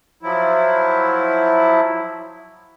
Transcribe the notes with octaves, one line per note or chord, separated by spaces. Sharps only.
F3 F#3 E4